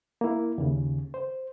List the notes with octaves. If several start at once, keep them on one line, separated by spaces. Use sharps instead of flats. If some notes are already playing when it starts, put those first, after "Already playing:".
A#3 E4
D#2 C#3
C5